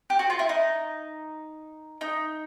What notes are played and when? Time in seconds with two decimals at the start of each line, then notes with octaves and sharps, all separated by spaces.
0.10 G4
0.19 F#4
0.30 F4
0.39 E4
0.49 D#4
2.01 D#4